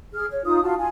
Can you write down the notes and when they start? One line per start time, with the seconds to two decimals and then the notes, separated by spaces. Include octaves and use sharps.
0.14 G#4 F6
0.31 C#5
0.45 D#4 F4 D#6
0.62 F4 F#4 A5
0.78 F4 G#5